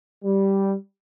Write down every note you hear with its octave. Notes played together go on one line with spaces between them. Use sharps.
G3